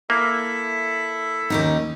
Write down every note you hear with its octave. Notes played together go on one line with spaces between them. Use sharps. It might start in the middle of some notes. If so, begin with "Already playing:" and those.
A#3 E4 A4 E5
D#2 C#4 D#4